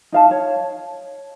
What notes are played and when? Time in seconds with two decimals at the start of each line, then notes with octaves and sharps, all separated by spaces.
0.12 D#4 F5 A5
0.31 C#5